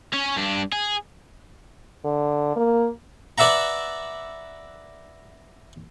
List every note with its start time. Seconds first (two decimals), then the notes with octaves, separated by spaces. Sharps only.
0.13 C#4 C#5
0.36 G2 D4
0.72 G#4
2.05 D3
2.56 A#3
3.38 B4 D5 E5 F#5 A#5